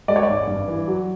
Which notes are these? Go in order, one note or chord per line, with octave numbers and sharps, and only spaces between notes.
G#3 D5
C#5
G#1 D5
G2
E3
F#3